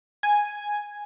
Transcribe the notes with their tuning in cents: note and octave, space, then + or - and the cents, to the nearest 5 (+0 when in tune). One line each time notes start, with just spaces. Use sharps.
G#5 +0